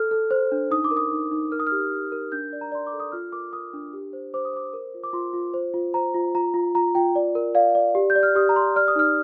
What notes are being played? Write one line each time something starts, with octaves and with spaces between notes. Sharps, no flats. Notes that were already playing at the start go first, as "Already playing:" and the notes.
Already playing: A4 F6
A4
C5
D4
D#4 D#6
D6
A#4
D#6
D#4
D#4
A#4 F6
D#6
G4 F6
G4
A#4
D4 G6
D5
A#5
D5 C6
D6
A4
D#6
F4 F6
A#4 D6
A#4 D#6
D4
G4
C5
C5 D6
D#6
C5 D6
A#4
F4
D6
F4 C6
F4
C5
F4
C5 A#5
F4
F4 A#5
F4
F4 A#5
F4 G5
D5
A#4
D5 F5
D5
G4
G6
D5
F6
G4 D#6
A#5
G4 C6
D5 F6
D#6
D#4 F6